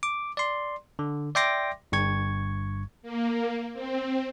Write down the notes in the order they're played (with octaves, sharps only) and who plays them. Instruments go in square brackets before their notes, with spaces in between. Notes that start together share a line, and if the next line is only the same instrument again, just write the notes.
[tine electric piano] D6
D5 C6
D3
D5 E5 G5 C6 D6 A#6
G1 G2 C#6 G#6
[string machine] A#3
C4